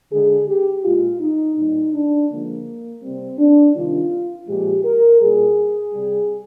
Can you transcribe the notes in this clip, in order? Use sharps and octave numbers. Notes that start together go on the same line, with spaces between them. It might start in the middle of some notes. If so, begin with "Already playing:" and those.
D3 G#3 G#4
G4
A#2 G#3 F4
D#4
A#2 G3 D#4
D4
D3 F3 G#3 A#3
C3 G3 C4
D4
C3 D#3 G3 F4
A#2 F3 G#3 G4
A#4
A#2 G3 G#4
C3 G3